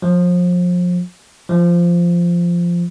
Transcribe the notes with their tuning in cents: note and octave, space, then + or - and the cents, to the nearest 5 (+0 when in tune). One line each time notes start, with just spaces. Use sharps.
F3 +30
F3 -10